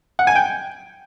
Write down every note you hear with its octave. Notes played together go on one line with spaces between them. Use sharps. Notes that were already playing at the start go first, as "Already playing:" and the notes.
F#5
G#5
G5